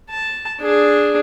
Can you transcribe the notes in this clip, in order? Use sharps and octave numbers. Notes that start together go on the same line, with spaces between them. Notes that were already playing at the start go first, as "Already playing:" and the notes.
A5
D4 G#4